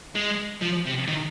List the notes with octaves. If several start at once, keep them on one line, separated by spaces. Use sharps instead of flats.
G#3
F3
C3
D#3